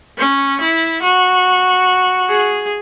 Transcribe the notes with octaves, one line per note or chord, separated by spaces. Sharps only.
C#4
E4
F#4
G#4